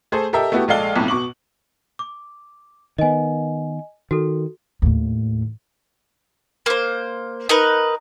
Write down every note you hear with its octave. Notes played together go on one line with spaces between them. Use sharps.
A3 G#4 A4 C5
G4 A4 A#4 D#5 E5
A3 B3 E4 F#4 G4
A#1 G#3 A4 D5 F5 G7
B1 F2 A2
B2 C#6 D6 F#7
D6
D#3 B3 D#5 G#5
D#3 F#4 A4
D#2 A2
A#3 C5
D#4 A#4 B4